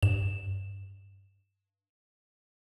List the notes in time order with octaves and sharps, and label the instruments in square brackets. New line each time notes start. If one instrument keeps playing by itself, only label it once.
[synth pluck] G2 E7